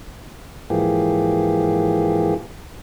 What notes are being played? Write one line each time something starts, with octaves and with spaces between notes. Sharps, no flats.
G#2 E3 F3 A#3 G4 G#4